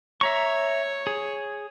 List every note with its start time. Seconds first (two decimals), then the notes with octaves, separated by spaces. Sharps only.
0.21 C#5 E5 A#5 C#6
1.07 G#4